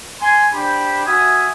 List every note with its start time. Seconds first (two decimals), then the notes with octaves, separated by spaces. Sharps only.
0.20 G#5 C6
0.54 D4 G4 C5 G5 B5
1.07 F#4 E5 G#5 D#6